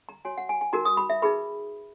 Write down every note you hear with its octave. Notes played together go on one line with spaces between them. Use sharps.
A#5
F#4 C#5 G#5
F#5
G#5
G#5
D#4 F#4 A#4 A#5
D#6
B5
E5
D#4 G#4 B4 B5